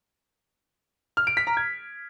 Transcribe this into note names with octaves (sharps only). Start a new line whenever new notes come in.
F6
D7
B6
A#5
G#6